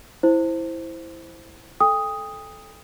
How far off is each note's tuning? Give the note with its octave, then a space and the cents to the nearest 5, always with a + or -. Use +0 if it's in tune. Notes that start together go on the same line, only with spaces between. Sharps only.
E4 +0 C5 +0
A4 -15 G5 +40 D#6 +5